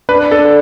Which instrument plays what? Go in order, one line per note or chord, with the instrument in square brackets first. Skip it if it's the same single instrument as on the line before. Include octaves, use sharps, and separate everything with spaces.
[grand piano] D4 [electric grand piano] B4
[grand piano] D4 [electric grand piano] A4